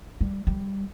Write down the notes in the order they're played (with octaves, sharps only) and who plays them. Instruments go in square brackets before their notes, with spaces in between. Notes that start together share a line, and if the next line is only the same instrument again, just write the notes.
[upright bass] G3
G3